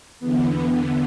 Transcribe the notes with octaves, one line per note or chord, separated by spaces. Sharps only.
E2 D3 B3
B3